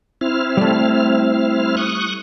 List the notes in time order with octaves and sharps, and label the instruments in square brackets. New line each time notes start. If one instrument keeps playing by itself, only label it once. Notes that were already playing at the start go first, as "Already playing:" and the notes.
[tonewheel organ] C4 E4 F6
[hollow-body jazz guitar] G3 A3
[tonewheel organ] C#6 D#6 F#6